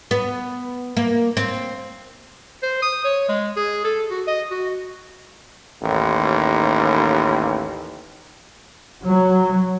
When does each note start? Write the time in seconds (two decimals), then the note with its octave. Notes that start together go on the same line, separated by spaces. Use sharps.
0.11 B3
0.97 A#3
1.37 C4
2.63 C5
2.82 D#6
3.04 C#5
3.28 G#3
3.56 G#4
3.84 A4
4.10 F#4
4.27 D#5
4.51 F#4
5.81 A1 D#2
9.04 F#3